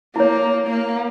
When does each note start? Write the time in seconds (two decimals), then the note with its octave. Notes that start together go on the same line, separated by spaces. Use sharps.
0.16 A#3 E4 C#5
0.67 A#3